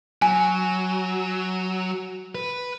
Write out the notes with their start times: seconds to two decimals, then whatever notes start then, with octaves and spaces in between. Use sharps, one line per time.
0.22 F#3 G#5
2.35 B4